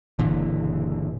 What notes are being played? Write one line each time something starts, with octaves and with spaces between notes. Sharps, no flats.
F#1 A#2 D3 E3